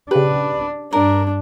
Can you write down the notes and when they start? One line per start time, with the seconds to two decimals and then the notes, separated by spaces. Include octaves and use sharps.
0.11 C#3 D4 G4 B4
0.93 G2 D4 A#4